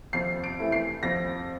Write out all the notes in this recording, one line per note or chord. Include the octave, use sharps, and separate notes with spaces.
F2 C7
D7
E3 A3 E4
C7
F2 A#6